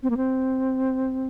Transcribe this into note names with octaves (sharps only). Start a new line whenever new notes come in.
C4
A#3
C4